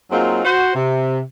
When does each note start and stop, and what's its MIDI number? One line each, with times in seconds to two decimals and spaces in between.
0.11 0.44 54
0.11 0.44 58
0.11 0.44 60
0.11 0.44 63
0.11 0.44 65
0.11 0.44 68
0.44 0.73 66
0.44 0.73 72
0.75 1.20 48